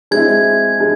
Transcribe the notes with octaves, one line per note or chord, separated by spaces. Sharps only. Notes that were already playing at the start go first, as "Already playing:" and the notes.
G#3 C4 E4 G#6
G#3